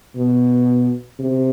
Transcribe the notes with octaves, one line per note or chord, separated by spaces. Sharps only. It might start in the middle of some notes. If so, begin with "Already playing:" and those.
B2
C3